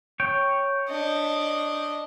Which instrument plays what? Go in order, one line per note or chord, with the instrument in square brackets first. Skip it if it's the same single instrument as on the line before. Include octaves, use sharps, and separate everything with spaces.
[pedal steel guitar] C#5 G5
[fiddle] D4 D#5